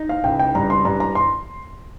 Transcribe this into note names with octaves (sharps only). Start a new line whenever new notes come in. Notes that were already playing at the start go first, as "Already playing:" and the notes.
Already playing: D#4
F5
C#2 G5
G5
G2 A#5
C6
G2 A#5
A#5
C6